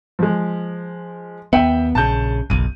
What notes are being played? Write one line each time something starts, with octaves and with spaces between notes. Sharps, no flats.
F3 G#3
D#2 B3 E5 G5
A#1 C#3 A5 G6
F#1 B1 D#7